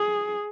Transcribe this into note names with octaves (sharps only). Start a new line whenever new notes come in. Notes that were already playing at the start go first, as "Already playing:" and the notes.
Already playing: G#4